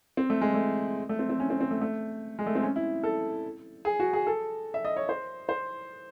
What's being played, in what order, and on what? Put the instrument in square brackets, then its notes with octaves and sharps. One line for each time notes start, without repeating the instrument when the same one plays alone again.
[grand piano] C4
A3
G#3
A3
A3
C4
C4
C#4
C4
C4
A3
A3
G#3
A3
C4
C#4
E4
A4
G#4
F#4
G#4
A4
E5
D#5
C#5
C5
C5